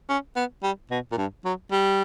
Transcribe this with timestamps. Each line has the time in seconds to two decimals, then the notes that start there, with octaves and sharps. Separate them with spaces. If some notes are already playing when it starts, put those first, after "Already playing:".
0.09 C#4
0.36 B3
0.63 G3
0.91 B2
1.12 A#2
1.18 G2
1.45 F#3
1.72 G3